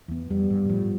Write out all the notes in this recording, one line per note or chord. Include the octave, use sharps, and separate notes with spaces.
E2 B3
F2 G3
G2 G3
B2
A2 F3